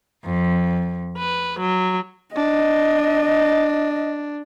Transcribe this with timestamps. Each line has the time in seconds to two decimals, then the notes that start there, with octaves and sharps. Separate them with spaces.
0.25 F2
1.18 B4
1.60 F#3
2.35 D4 D#5